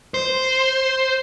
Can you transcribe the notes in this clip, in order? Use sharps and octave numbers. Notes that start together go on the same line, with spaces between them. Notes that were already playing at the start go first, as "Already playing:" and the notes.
C5